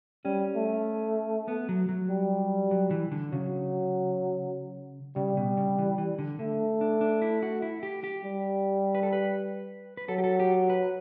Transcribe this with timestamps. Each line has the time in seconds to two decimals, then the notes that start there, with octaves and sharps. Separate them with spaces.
0.25 G3 C#4
0.56 A3
1.48 B3
1.69 F#3
1.89 F#3
2.09 G3
2.71 F#3
2.91 E3
3.12 D3
3.32 C#3 F#3
5.16 C#3 G3
5.37 B2
5.57 C#3
5.79 E3
5.98 E3
6.19 D3
6.39 D3 A3
6.81 D4
7.01 D4
7.22 E4
7.43 F#4
7.62 E4
7.83 G4
8.04 G4
8.24 G3
8.95 B4
9.03 A4
9.13 B4
9.97 B4
10.08 F#3 A4
10.18 G4
10.24 A4
10.40 G4
10.70 B4